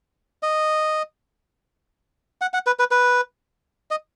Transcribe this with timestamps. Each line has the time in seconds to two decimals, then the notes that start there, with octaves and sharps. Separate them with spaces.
0.43 D#5
2.41 F#5
2.54 F#5
2.66 B4
2.79 B4
2.91 B4
3.91 D#5